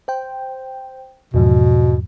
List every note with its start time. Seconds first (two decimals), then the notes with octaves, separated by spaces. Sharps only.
0.08 C5 G5
1.34 E2 G#2 B2 F3